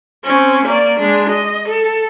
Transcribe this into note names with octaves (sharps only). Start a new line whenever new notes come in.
C4 C#4
A#3 D5
G#3 D4
D#5
A4